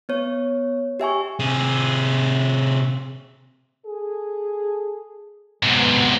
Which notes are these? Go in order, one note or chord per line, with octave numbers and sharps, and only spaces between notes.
B3 C#5
G4 E5 G#5 C#6
C3 G#4
G#4 A4
G#2 C3 F#3 B3